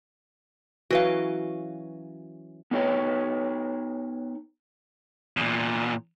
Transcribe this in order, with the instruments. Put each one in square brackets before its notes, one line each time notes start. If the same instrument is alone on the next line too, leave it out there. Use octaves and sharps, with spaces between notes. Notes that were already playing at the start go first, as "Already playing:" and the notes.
[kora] E3 F#3 C#4 [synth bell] F#4 B4 F5
[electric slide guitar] B3 D#4 C#5 G5
[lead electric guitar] E2 A#2